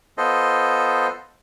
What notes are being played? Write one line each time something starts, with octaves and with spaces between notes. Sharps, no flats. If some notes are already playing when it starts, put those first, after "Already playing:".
B3 F4 A4 C5 D#5